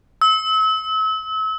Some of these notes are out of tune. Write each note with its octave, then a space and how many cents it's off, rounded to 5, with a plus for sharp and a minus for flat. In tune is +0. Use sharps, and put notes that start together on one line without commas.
E6 -35